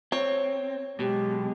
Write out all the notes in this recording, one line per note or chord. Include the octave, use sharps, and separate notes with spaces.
C4 C#5
B2 F#3 G#3 G4